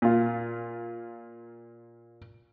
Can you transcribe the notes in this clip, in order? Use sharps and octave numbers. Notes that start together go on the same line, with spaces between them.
A#2 F4